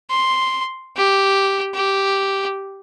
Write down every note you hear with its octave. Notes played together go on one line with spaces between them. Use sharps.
C6
G4
G4